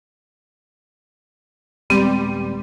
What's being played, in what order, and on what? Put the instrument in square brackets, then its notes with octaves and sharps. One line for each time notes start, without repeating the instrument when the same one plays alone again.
[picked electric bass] D#1 G#3 B3 [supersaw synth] G3 [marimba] C4